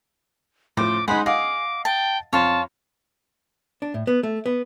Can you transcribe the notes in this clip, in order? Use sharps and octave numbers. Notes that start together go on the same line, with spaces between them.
A2 F3 C5 D6
G#3 D#4 G#4 C5 F#5 B5
G#4 D#5 F5 F#5 D6
G5 A5
F2 C#5 F5 A5 C6
D4
A2
B3
A3
B3